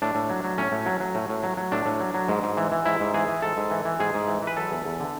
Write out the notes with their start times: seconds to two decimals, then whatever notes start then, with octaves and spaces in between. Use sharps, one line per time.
0.02 A2 D4
0.15 A2
0.30 F#3
0.44 F#3
0.58 A2 C#4
0.72 A2
0.86 F#3
1.00 F#3
1.15 A2
1.29 A2
1.43 F#3
1.57 F#3
1.72 A2 D4
1.86 A2
2.00 F#3
2.14 F#3
2.28 G#2
2.43 G#2
2.57 E3
2.72 E3
2.86 G#2 E4
3.00 G#2
3.14 E3 G#4
3.28 E3
3.42 G#2 A4
3.57 G#2
3.71 E3
3.85 E3
4.00 G#2 G#4
4.14 G#2
4.28 E3
4.42 E3
4.47 B4
4.56 F#3 A4
4.71 E2
4.85 E2
5.00 D3